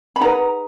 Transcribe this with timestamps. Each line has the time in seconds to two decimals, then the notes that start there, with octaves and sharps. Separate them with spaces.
0.16 B5
0.21 D#4 G#4 B4 F#5 A#5